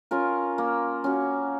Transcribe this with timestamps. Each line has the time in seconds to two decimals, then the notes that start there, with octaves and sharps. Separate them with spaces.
0.11 C#4 F4 A#4
0.58 A#3
1.04 C#4 F#4